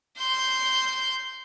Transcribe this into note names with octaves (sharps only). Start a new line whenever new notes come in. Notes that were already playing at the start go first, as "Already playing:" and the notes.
C6 G6